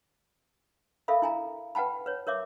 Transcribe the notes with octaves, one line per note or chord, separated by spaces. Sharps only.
A4 A#4 E5 F5 B5
E4 G#5 A#5
B4 F#5 G5 A5 B5
B4 C#5
A#4 C#5 E5 D6